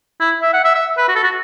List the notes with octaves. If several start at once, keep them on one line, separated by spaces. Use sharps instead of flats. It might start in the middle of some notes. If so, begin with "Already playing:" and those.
E4
E5
F#5
E5
E5
B4
F#4
A4
F#4